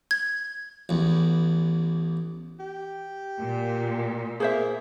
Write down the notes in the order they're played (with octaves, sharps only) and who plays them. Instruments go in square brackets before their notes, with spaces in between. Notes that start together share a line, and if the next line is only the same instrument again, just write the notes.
[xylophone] G#6
[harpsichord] A1 E2
[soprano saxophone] G4
[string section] A#2
[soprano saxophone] A#3 [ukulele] G#4 C5 E5